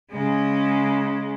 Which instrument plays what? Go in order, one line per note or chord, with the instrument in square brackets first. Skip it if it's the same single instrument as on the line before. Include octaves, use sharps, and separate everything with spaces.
[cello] C#3 G#3